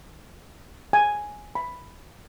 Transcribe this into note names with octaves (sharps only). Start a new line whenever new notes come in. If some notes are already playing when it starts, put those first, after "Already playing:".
G#5
B5